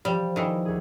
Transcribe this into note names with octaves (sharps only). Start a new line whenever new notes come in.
F3 G3
D#3 E3
D2 G#4